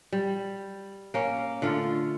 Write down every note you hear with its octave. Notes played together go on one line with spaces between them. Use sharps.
G3
A#3 C#4
D3 A3 F4